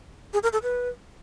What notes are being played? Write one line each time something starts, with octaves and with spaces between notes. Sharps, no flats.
G#4
A#4
A4
B4